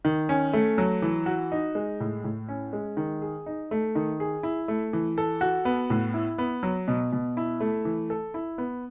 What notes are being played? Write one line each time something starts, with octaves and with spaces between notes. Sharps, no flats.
D#3
C#4
A3
F#3
E3
F#4
D#4
G#3
A2
A2
C#4
G#3
D#3
G#4
D#4
A3
D#3
G#4
E4
A3
E3
A4
F#4
B3
A2
E4
B3
F#3
B2
B2
E4
A3
E3
A4
E4
B3